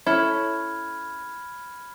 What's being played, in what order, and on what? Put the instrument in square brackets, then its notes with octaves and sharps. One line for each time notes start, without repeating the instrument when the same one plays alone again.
[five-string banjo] C#4 E4 A4 [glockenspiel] B5 F6 G#6